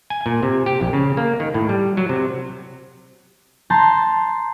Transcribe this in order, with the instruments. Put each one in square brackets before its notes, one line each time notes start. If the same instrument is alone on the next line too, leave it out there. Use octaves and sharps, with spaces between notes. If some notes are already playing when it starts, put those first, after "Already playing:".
[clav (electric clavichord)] G#5
A#2
C3
G4
A#1
C#3
A#3
D#3
A2
G3
F#3
C3
[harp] A5 A#5 C6 G6